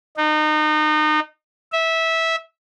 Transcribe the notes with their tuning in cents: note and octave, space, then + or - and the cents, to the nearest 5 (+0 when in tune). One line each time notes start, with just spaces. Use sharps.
D#4 -30
E5 -15